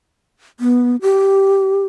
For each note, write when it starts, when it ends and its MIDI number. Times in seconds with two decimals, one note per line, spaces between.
0.60 0.96 59
1.02 1.86 67